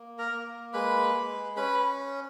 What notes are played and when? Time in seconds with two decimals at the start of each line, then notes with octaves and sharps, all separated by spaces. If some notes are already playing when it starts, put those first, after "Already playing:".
Already playing: A#3
0.18 A#4 A#5
0.32 A#3
0.73 G#3 B4 B5
1.15 G#3
1.56 C#4 B4 B5